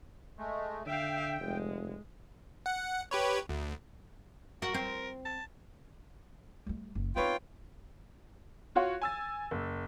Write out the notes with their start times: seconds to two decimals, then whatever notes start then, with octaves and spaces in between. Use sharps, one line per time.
0.38 G#3 A3
0.86 D3 E5 F5 G5
1.41 F1 G#3
2.66 F#5
3.11 G4 B4 C#5
3.49 D2
4.62 F#4 A#4
4.74 C4
5.25 A5
6.67 G3 A3
6.95 F#1
7.16 B3 C4 D#4 F4 B4 C#5 G5
8.75 F4 F#4 C#5 F#5
9.02 G#5 E6 A6
9.51 F#1